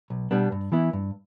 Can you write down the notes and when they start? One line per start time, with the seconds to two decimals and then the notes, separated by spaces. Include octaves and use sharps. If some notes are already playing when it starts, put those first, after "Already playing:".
0.10 B1
0.31 B2 G3 B3 D4
0.52 G2
0.72 E3 B3 E4
0.93 G2